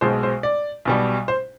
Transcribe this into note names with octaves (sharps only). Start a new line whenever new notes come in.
B1 B2 G#3 C5
C5
D5
B1 B2 G3
C5